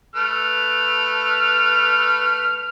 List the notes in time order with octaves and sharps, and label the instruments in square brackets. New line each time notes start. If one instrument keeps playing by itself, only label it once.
[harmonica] A3 B4 F6